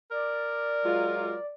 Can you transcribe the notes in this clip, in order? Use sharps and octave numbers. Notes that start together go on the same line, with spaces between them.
A#4 D5
F#3 G#3 F4